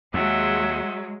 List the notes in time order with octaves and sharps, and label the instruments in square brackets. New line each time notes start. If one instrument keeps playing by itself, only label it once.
[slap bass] D#2 [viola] F#3 [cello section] G#3 [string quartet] E5 F#5 C6